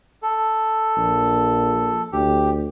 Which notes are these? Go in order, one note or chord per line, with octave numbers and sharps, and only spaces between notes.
A4
A#1
D2 G4